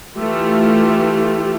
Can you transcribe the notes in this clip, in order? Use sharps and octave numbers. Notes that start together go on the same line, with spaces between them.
E3 A3 F4 G4